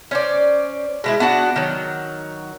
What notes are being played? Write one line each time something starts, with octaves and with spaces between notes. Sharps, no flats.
C#4 C5 D5
B2 G#3 E4
B3 D4 F#4 F#5
D#3 F#3